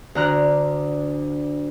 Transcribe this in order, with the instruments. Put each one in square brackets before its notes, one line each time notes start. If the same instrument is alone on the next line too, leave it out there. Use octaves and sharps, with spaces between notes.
[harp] D2 D3 A#5 F6 F#6